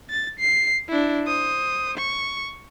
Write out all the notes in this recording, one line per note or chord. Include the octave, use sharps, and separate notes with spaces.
A6
C7
D4 E4
C5 D#6
C#6